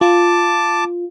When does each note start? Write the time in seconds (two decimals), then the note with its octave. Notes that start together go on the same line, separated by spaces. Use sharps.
0.01 F4 A5 D6